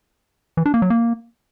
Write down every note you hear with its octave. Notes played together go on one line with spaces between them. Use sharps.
E3
D4
A#3
F#3
A#3